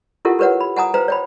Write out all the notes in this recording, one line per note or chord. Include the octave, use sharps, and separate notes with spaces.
E4 F4 G4 A4 A#4 F#5
G4 A#4 B4 C#5 F#5
B5
F#5 G#5 A#5 D#6
B4 C5 F5 G5 A#5
C#5 G5 B5